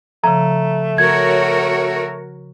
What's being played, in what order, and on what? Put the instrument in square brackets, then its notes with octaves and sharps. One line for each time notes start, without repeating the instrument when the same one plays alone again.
[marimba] C#3 F3 [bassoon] A3 [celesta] A#5
[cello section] F#4 A#4 C#5 [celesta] G#6